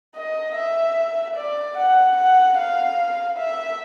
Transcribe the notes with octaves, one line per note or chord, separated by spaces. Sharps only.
D#5
E5
D5
F#5
F#5
F5
E5